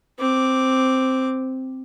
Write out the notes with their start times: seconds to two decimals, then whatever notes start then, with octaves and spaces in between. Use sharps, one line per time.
0.19 C4 D6